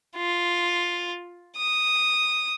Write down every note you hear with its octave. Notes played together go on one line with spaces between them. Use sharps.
F4
D#6